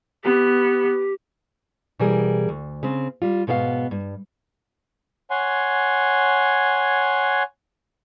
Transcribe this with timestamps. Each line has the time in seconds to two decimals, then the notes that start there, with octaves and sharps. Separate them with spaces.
0.24 B3 G4
1.99 B2 E3 G3 G#4 A#4
2.49 D2
2.83 C#3 C4
3.22 G3 F4
3.47 G#2 B2 B3 A4 F5
3.91 G2
5.30 C#5 F#5 G#5 C6